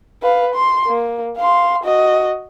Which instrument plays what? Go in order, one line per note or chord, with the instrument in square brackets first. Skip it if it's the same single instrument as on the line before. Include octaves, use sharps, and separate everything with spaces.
[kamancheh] B4 F5
C6
A#3
F5 C6
F#4 D#5